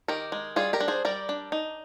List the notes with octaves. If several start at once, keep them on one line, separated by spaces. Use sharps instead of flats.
D#3 G4 A#4
G#3
G3 F4 G#4
G4 A#4
D4
G#4 C5
G3 A#4 D5
D4
D#4